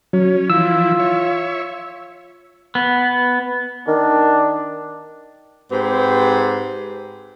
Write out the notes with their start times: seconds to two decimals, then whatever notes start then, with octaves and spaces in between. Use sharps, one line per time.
0.13 F#3 C#4
0.50 E3 F3 E4 F4 E6
0.99 C#5 E5
2.75 B3
3.88 D#3 D4
5.71 G#2 C4 G4 B4